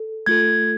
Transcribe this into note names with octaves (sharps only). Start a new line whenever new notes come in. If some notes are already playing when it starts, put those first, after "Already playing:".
Already playing: A4
A3 F4 A4 G#6